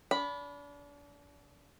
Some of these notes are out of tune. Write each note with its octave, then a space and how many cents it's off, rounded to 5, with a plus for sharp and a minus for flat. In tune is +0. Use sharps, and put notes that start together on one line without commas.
D4 -35 B5 +0